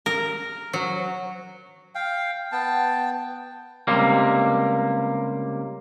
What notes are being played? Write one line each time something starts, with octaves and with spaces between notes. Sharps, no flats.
A#4
F#3
F5 G5
B3 G5 A5
C#2 C3 G3 A#3